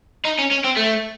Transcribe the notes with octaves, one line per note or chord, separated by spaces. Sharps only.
D#4
C#4
C#4
C4
A3